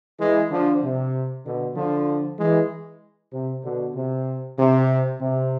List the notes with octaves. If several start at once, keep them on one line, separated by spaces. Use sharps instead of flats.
E3 G#3
D3 F3
C3
B2 D3
D3 F3
E3 G#3
C3
B2 D3
C3
C3
C3